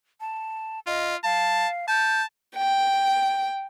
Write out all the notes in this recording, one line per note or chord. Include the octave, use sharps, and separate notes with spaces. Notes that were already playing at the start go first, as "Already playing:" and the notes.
A5
F4 D#5
F5 A5
A5 G6
G5